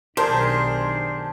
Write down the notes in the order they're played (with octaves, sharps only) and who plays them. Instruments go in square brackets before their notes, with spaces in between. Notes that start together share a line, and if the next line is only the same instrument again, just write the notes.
[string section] B1 D#3 [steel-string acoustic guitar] D4 [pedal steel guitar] G4 G#4 [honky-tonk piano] A#4 C5